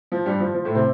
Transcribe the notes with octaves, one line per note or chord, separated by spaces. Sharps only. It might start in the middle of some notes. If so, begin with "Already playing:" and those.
F3
G2 G3
F3
F3
A2 A3
C3 C4